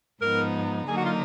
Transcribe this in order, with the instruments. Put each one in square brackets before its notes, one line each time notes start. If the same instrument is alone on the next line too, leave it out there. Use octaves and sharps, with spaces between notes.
[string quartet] G#2 F3 B3 D#4 [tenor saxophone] A#4
[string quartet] D3 F#3 A#3 D#4 [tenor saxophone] G#4
[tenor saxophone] F#4
F4